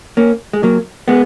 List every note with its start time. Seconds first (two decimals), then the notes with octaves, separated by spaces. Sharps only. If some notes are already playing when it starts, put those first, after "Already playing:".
0.17 A#3 C#4
0.53 G#3
0.63 F#3 A#3
1.08 G#3 B3